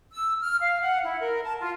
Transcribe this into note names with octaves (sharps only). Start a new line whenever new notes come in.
E6
F6
F5
F#5
E4
A#4
A5
F4